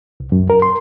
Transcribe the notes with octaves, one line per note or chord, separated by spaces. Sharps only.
C2
F#2
A#4
C6